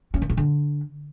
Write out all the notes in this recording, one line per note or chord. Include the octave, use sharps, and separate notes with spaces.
C#4
D#3
C#3
D3